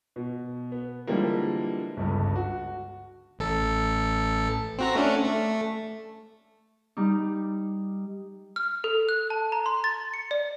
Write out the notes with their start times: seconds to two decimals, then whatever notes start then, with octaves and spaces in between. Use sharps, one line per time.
0.16 B2
0.72 B3
1.07 D3 E3 F3 G3 G#3 A#3
1.97 G1 C#2 G2
2.35 F#4
3.39 A1 A4
4.79 C4 F#4 A#5
4.95 A3 C#4 D4
5.25 A3
6.97 G3 D#4
8.56 F6
8.84 A4
9.09 F#6
9.30 A5
9.52 A#5
9.66 C6
9.84 A6
10.14 C#7
10.31 D5